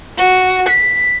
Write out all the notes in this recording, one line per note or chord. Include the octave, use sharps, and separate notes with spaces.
F#4
B6